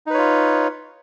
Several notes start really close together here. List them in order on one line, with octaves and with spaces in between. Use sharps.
D#4 B4 C#5 F4